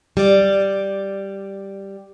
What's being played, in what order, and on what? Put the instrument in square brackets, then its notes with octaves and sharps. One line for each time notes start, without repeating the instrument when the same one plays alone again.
[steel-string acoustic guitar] G3 D5